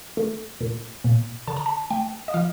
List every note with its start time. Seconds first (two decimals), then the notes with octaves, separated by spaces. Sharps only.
0.17 A3
0.61 A#2
1.04 A#2
1.47 D3 A5
1.57 A#5
1.66 A5
1.90 A3 G5
2.28 D#5
2.34 F3 F5